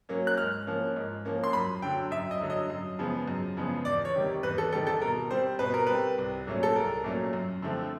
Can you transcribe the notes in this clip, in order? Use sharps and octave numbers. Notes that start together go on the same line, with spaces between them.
F#3 A#3 C#4
F#6
G#2 F6
F3 A#3 C#4
G#2
F3 A#3 C#4
C6
F#2 B5
D3 F#3 G5
F#2 E5
D#5
D3 F#3
D#5
F#2
C#3 F3 G#3 B3
F#2
C#3 F3 G#3 B3
E2 D5
C#5
C3 D#3 G3
E2 B4
A4
C3 D#3 G3 A4
A4
B2 A#4
G3 C4 C5
B2 B4
A#4
G3 C4 B4
C2
A#2 F#3 A3 C#4
A4
C2 A#4
A#2 F#3 A3 C#4
F#2
D3 F3 A3 C4